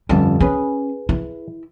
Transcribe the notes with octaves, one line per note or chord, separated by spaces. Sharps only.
G1 F2 G3 C#4 A5
C#4 G#4 B4
E4